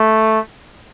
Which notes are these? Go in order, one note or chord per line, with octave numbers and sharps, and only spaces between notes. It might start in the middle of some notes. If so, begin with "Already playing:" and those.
Already playing: A3